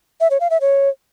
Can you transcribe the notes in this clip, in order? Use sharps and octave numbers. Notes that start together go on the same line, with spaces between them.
E5
C#5
F5
E5
C#5